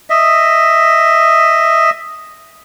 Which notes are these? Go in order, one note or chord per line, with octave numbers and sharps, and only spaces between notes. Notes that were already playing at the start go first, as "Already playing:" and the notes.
D#5 E5